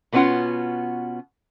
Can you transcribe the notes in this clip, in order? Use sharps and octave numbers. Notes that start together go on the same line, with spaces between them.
B2 A3 B3 C#4 F4 F#5